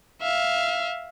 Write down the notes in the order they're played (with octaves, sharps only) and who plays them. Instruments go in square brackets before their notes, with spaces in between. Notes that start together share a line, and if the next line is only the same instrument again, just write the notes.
[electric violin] E5 F5